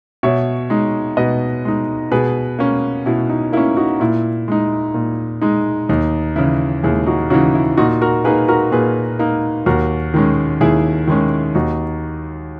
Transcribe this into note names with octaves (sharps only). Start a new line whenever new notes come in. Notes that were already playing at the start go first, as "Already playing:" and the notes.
B2 C#5 E5
G#3 D#4
B2 B4 D#5
G#3 D#4
B2 G#4 B4
A#3 C#4
B2 E4
D#4
A#3 C#4 E4
D#4 F#4
A#2 E4
G#3 D#4
A#2
G#3 D#4
D#2 D#4
C#3 E3 E4
D#2 E4 G#4
D#4 F#4
C#3 E3 D#4 F#4
E4
A#2 D#4 F#4
F#4 A#4
A#3 D#4 G#4 B4
F#4 A#4
A#2 G#4 B4
A#3 D#4
D#2 F#4 A#4
D#3 G#3 C#4
D#2 E4 G#4
D#3 G#3 C#4
D#2 D#4 F#4